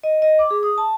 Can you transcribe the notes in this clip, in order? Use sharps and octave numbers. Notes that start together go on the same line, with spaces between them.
D#5
D#5
D6
G#4
D#6
A5